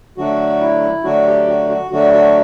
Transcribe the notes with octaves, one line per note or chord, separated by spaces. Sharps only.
D3 F#3 A3 D4 F#4
E4
D3 F#3 A3 D4 F#4
G4
F#4
F#4
D3 F#3 A3 D4 F#4
F#4